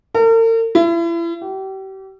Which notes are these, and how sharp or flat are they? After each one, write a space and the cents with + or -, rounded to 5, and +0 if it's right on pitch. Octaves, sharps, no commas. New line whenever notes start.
A#4 -45
E4 +35
G4 -35